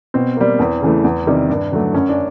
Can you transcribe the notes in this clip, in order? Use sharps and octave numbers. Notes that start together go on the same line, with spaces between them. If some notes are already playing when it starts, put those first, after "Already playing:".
B2 C4
G3 A#3
E2
C#3 E3 A3
E2
C3 D#3 G3
G2
D3 F#3 A3
F#2 C#4
D4